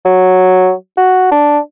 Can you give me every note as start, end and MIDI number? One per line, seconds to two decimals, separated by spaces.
0.05 0.72 54
0.97 1.28 66
1.31 1.59 62